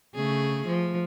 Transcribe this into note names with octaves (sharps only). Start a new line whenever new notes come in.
C#3 A3 G#4
F3